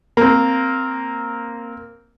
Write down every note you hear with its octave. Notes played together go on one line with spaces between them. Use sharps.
A#3 C4